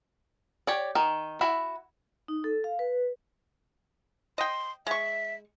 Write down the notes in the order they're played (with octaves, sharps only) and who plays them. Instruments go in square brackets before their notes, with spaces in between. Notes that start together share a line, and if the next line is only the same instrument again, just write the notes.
[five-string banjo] G4 C#5 D5
D#3
E4 F#4 B5
[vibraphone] D#4
A4
F5
B4
[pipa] D#5 G5 [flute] C6
[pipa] G#3 C#6 [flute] E5